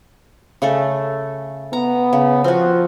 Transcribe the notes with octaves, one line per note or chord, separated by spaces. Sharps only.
C#3 A3 A4
B3 A#5
C#3
F3 C4 F#4